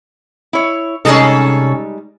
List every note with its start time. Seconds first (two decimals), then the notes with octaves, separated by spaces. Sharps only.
0.53 E4 C#5
1.05 C3 G3 G#3 C#4 D#4 G#4 A4